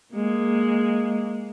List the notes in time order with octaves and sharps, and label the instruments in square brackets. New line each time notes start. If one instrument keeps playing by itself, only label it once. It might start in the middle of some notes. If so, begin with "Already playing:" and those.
[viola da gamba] G#3 A#3